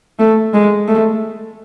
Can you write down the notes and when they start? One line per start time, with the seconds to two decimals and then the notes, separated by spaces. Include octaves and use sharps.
0.19 A3
0.53 G#3
0.88 A3